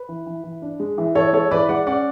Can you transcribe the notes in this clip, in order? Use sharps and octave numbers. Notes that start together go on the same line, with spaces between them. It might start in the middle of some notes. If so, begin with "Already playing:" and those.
Already playing: B4
E3
E3
E3
D4
G#3
E3
E3 A4 C#5
G#3 A4 C#5
E3 B4 D5
G#3 D5 F#5
C#4 D5 F#5